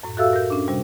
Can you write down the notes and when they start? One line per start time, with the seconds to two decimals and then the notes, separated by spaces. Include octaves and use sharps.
0.03 F#2 A2
0.17 F#4 G4 A4 E5 F5 E6
0.33 A#4 G6
0.50 C#4 D4
0.68 C3 G3